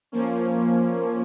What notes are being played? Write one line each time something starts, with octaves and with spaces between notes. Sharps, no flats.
F3 A#3 C#4